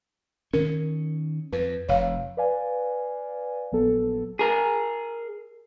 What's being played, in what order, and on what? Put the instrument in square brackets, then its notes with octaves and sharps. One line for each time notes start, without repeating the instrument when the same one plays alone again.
[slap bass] D#3 C#4 [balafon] A#4
[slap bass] F2 [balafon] B4
[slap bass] F1 [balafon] C#5 F5
[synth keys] B4 D5 F5 G#5
A#1 F#3 B3 A4
[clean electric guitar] G#4 A#4